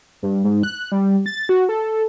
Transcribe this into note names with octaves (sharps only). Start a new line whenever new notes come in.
G2
G#2
F#6
G3
A6
F#4
A4